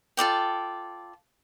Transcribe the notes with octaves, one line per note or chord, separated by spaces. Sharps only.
F4 A4 D5 G5